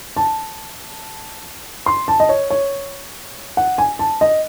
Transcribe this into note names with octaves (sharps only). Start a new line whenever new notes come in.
A5
C6
A5
D#5
C#5
C#5
F#5
G#5
A5
D#5